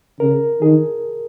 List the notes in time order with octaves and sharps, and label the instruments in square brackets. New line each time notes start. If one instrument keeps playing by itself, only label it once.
[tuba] C#3 [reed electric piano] A#4
[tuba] D#3 [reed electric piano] G#4